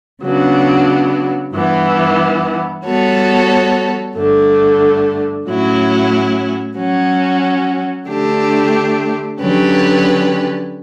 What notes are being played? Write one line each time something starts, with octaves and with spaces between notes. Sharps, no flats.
C#3 F#3 B3 D4
G2 E3 B3
G3 B3 F#4 A4 C#5
G2 D3 A3
A2 F#3 C#4 E4
F#3 C#4 F#4
D3 A3 D4 G4
D3 F#3 C#4 G4 B4